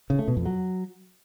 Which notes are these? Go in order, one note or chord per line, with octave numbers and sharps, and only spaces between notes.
C#3
A3
B2
F2
F#3